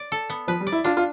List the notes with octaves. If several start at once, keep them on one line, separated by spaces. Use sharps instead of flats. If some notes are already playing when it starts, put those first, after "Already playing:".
Already playing: D5
A4
B3
F3 B4
G3
D5
E4
D4 F4
F4